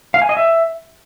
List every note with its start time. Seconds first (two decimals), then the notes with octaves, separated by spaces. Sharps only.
0.14 F5
0.22 G#5
0.29 D#5
0.37 E5